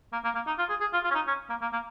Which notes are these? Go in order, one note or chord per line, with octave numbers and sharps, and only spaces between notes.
A#3
A#3
A#3
D#4
F4
G#4
G#4
F4
F4
C#4
D#4
C#4
A#3
A#3
A#3